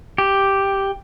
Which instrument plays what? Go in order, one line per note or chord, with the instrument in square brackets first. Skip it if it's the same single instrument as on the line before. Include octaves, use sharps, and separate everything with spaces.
[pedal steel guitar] G4